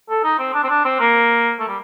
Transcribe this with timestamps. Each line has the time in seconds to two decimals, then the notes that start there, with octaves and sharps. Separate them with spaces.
0.10 A4
0.24 D#4
0.39 C4
0.54 D4
0.64 C4
0.69 D4
0.85 C4
1.00 A#3
1.60 A3
1.68 G3